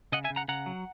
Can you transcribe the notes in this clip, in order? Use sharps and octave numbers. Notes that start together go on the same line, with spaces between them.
C#3 D#5 F#5
E5 G#5
C#3
F#5 A#5
C#3 F#5 A#5
F#3